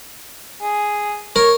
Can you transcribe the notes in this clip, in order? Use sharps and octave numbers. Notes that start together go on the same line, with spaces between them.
G#4
A#4 C#5